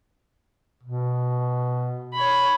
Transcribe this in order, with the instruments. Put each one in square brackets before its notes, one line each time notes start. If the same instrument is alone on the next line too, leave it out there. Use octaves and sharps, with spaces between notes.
[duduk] B2
[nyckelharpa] C#5 B5